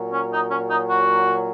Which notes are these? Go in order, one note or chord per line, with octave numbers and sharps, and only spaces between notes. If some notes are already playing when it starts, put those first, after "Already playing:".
Already playing: A#2 F#3
C#4
D#4
C#4
D#4
F#4